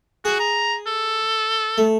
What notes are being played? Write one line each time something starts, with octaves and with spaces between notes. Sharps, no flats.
F#4 G#4
A#5
A4
A3